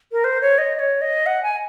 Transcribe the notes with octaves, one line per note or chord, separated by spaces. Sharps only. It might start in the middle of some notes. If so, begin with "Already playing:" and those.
A#4
C5
C#5
D#5
D#5
C#5
D#5
F#5
G#5